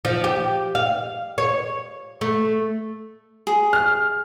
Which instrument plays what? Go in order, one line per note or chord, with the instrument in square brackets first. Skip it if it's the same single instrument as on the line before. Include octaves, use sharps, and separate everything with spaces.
[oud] F3
G4
F5
C#5
A3
[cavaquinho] G#4
[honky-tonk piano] F6